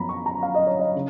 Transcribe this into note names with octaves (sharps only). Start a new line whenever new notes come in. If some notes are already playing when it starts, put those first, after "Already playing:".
Already playing: F#2 F3 B3 A#5 B5
C#6
A#5
F5
D#5
C#5
D#5
C#3